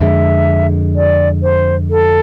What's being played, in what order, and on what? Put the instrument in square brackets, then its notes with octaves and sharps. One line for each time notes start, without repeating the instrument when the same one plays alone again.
[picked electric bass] F2 D3 G#3 [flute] E5
[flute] D5
C5
A4